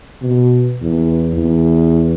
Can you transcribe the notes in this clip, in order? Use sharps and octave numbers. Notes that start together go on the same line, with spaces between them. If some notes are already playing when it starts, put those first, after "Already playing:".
B2
E2
E2